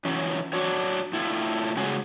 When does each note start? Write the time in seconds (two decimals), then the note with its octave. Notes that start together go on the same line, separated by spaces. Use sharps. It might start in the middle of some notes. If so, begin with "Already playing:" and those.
0.05 E3 F#3 C#4
0.53 D4 F#4 C#5
1.13 A2 E4 F4
1.77 C#3 F#3 G#3 A3 F#4 G#4